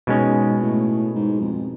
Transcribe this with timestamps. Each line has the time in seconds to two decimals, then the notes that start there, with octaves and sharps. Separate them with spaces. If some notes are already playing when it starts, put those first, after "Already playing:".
0.07 G#2 B2 G#3 C#4
0.61 A2
1.15 G#2
1.40 F2